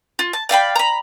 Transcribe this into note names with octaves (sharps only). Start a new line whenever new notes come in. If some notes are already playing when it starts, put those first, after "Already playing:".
F4
A5
D5 F5 G5 B5
A#5 B5